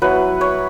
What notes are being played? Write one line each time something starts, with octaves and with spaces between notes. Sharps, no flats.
F#3 B3 E4 B4
C#5